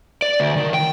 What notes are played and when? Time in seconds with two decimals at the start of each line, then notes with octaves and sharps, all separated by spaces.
0.22 D5
0.40 D2
0.57 D#3
0.74 G5